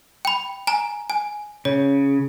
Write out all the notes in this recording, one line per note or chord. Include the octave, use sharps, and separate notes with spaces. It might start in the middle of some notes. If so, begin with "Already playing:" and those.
G5 B5
G#5 A#5
G#5
C#3 C#5